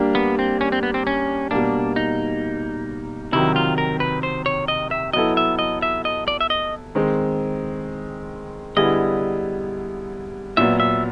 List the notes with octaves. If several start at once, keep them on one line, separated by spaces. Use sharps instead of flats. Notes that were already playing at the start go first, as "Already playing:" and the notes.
Already playing: G3 A#3 D4 G4
B3
C4
C#4
C4
B3
C4
C#4
B2 G3 A#3 D4
D#4
C3 D#3 F#3 E4
F4
A#4
B4
C5
C#5
D#5
E5
F#3 B3 E4 A4 D#5
E5
D#5
E5
D#5
D5
E5
D#5
D#3 G#3 C4
D3 G3 B3 E4 G#4 D#5
A#2 F#3 B3 E5
E5